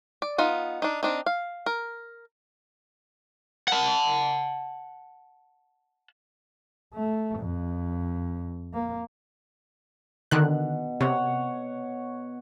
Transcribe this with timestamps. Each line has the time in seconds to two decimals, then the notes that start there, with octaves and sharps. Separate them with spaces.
0.22 D5
0.38 B3 D#4 F4
0.82 D4 D#4
1.03 C4 D4 D#4
1.26 F5
1.66 A#4
3.68 F#5 A5
6.94 A3
7.39 F2
8.74 A#3
10.31 B2 D3 D#3 F#6
11.01 C3 C#5 F#5